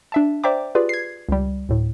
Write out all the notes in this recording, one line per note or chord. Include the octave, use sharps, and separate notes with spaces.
D4 E5 A5
C5 D5 E5 G5 A#5 D6
F4 G4 G#4 B4 D5
G#6 C7
C#2 G3
D2 A2